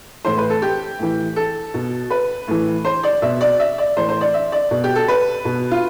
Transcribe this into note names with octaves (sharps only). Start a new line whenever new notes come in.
A2 E3 C5
B4
A4
G4
A2 E3
A4
B2
B4
A2 E3
C5
D5
B2 E5
D5
E5
D5
A2 E3 C5
C5
D5
E5
D5
B2
G4
A4
B4
B2
F4